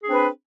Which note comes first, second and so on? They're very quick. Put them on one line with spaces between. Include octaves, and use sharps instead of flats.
G#4 D4 C4 B4